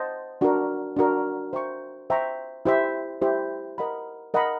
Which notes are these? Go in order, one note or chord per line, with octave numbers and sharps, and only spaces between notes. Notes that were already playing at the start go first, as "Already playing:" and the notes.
Already playing: C5 D#5 F#5 A5 C6
D4 F#4 A#4
D4 F#4 A#4
C5 E5 G5 A#5 C#6
C5 E5 G5 A#5 C#6
E4 G4 C5 E5
E4 G4 C5 E5
A#4 D#5 F#5 B5
A#4 D#5 F#5 B5